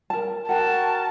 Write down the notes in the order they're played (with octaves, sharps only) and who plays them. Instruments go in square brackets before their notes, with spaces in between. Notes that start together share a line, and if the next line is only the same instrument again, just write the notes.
[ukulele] A#4 A5
[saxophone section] F#4 A#4 [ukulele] F#5 G5 [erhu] A5